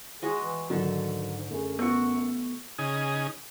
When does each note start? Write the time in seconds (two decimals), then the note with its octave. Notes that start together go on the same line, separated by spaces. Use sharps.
0.22 G#3 F#4 G#4 D#5
0.43 E3
0.70 G#2 D3 D#3 F#3 A4
1.51 F#2 A3 G#4
1.79 A3 B3 F#4 E6 C#7
2.78 C#3 D#4 G#4 D#6